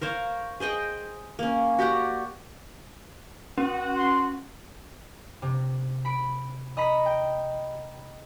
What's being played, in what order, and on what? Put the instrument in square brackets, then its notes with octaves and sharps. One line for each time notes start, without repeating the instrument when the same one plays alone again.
[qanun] A#4 C5 C#5 F5
G#4 C5 D#5 G5
A#3 C#4
F#4 G4 D5 F#5
[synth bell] C#4 [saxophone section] F#4
[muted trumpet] C6
[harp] C3
B5 D7
D#5 A#5 B5 B6
G5